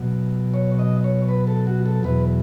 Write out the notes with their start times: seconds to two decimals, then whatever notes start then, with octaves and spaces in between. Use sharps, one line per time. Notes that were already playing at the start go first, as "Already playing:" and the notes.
Already playing: B2 F#3
0.54 C#5
0.79 D#5
1.04 C#5
1.28 B4
1.47 A4
1.67 F#4
1.86 A4
2.03 E2 B2 F#3 B4